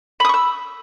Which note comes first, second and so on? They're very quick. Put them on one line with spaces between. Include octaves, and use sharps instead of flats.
B5 D#6 C#6 E6